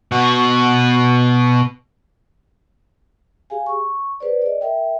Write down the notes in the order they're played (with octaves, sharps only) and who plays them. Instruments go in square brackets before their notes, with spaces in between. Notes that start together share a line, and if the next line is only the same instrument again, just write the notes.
[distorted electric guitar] B2 F#4
[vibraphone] G4 G#4 F5 G#5
C#6
G#4 B4 C5 D5
D5 D#5
A#4 E5 G5